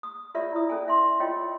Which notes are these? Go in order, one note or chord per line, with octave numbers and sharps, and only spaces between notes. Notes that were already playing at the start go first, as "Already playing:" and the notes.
D#6
F4 A#4 B4 C#5 D5 E5
E4 D#6
C#4 A4 G#5
E5 C6
F4 A#4 C#5 D#5 G5